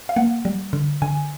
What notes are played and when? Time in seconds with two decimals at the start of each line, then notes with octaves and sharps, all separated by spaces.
0.09 F5
0.16 A#3 F#5
0.45 G3
0.73 D3
1.02 D3 G#5